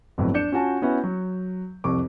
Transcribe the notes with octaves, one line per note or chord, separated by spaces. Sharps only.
G1 F2 A2 F#3
D4 G6 C#7 E7
C#4 F4 F#4 G#5 A5
B3 C#4 E4 F#4
F#3
C2 F2 C#6 D6